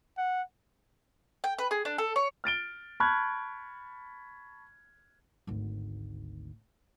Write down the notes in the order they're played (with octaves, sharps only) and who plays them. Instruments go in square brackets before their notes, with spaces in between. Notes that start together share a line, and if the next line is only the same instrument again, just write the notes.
[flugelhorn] F#5
[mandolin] G5
B4
G#4
D4
A4
C#5
[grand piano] F6 A6 D7 G7
A5 B5 C#6 F6 F#6 G#6
[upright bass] G#1 D2